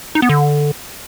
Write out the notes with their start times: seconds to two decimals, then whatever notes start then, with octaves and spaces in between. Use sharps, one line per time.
0.15 D#4
0.22 B3
0.29 D3